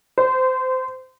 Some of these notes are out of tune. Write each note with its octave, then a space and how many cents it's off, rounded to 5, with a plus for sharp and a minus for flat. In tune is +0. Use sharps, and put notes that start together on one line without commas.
C5 -20